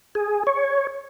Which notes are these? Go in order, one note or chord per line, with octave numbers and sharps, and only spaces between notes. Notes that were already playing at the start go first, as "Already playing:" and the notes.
G#4
C#5